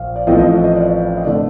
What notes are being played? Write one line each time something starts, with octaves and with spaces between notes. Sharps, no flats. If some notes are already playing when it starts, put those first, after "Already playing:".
Already playing: A#1 F5
D5
A1 A2 F3 A3 C4 D#5
D#5
D#5
D5
D#5
D3 A3 C4 D5